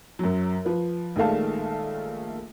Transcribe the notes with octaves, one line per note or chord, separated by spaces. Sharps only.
F#2 F#3
F3 B4
A#1 D#3 G#3 A3 F5 A5